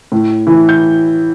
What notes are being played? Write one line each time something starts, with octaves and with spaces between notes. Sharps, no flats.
A2
E3
G6